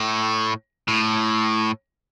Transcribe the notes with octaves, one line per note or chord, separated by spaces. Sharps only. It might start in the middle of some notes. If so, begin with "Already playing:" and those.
Already playing: A2
A2